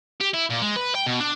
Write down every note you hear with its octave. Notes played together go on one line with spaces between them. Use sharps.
G4
E4
A#2
G#3
B4
G5
B2
D4